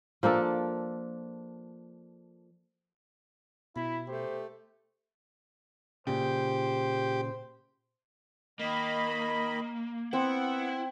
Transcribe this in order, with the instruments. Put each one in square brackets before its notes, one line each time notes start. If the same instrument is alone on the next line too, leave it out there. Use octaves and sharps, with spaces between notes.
[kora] F3 A#3 D4 A4
[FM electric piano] B2 [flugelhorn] E4 [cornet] B5
[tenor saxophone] A3 [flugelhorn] G4 [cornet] C5
[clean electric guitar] A#2 C#3 [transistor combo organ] G4 [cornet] C5
[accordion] D#3 D#5 B5 [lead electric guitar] A#3
[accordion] B3 F#5 [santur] C4 [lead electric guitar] E4